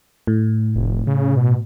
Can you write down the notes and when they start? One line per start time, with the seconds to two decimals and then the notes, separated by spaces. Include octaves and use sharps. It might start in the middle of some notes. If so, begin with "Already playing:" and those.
0.27 A2
0.76 F1
1.07 C#3
1.37 B2